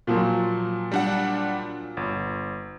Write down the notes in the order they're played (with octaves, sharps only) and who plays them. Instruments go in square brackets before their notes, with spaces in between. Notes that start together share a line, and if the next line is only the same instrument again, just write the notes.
[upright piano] A#2 F3 F#3
[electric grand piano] G3 D4 F#5
G1